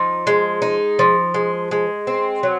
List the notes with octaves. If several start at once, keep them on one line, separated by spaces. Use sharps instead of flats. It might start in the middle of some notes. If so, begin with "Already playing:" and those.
Already playing: F3 D#4
G#3
D#4
F3
G#3
G#3
C4
F#3